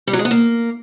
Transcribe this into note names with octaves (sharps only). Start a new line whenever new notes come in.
G3
F#3
G#3
B3
A#3